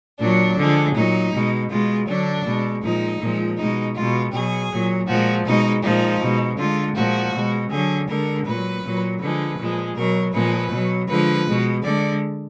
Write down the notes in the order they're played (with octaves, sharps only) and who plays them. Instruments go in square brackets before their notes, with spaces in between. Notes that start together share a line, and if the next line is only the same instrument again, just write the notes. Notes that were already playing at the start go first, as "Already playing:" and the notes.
[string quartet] A#2 F#3 D4
D3 F3 G#3
A#2 F#3 D#4
B2 G#3
B2 G#3 F4
D3 F#3 D4
B2 G#3
A#2 F3 G#3 D#4
A#2 F3 G#3
B2 G#3 D#4
B2 G#3 F4
B2 F#3 G#4
A#2 F#3
A#2 F3 G#3 F#4
B2 G#3 D#4
A#2 F3 G#3 D#4
B2 G#3
D3 G#3 F4
A#2 F3 G#3 F#4
B2 G#3
D3 F#3 G#4
D3 G#3 A#4
A#2 F#3 B4
A#2 F#3
D3 F3 G#3 B4
A#2 F3 G#3
B2 F#3 A#4
A#2 F3 G#3 B4
B2 F#3
D3 F3 G#3 B4
B2 G#3
D3 G#3 D5